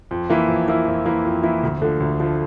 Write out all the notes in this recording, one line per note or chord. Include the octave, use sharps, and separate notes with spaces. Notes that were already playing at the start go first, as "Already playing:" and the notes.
F2
E3 A#3 E4
F2
E3 A#3 E4
F2
E3 A#3 E4
F2
E3 A#3 E4
D2
D3 F3 A3
D2
D3 F3 A3